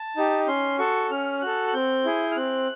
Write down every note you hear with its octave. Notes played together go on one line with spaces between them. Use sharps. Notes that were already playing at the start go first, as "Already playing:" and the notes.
Already playing: A5
D#4 G4
C#4 C6
F#4 A4 C#6
C#4 F6
F#4 A4 F#6
F#6
C4 G6
E4 G#4
F6
C4 F#6